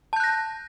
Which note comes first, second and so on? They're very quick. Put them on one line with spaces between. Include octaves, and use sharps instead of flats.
A5 G6 F#6 A#6